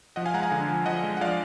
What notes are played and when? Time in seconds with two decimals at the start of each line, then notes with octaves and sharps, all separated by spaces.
0.16 F3 D#5 F#5
0.25 F5 G#5
0.34 G#3 F#5 A#5
0.42 F5 G#5
0.52 D3
0.68 F3
0.86 F3 D#5 F#5
1.03 G#3
1.17 F#5
1.21 F3 D5 F5